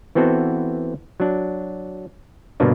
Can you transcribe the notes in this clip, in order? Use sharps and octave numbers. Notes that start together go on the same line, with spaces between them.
E3 B3 C4 F#4 A4
F#3 D4
G2 B2 D3 A#3 D4